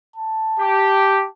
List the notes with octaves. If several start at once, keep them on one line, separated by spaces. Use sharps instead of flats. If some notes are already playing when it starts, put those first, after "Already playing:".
A5
G4